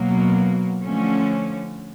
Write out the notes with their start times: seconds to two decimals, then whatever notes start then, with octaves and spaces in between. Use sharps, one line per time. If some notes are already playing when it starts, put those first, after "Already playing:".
Already playing: B2 F#3 A#3
0.83 D3 F3 A3 C#4